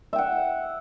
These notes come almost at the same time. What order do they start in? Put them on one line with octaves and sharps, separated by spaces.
E5 G5 F#5